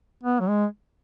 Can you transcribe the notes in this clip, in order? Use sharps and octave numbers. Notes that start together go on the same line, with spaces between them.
B3
F#3
G#3